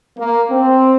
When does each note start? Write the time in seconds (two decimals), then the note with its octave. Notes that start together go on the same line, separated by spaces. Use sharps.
0.18 A#3
0.50 C4